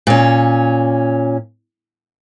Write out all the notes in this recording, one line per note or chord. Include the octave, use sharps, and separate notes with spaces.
A#2 C#4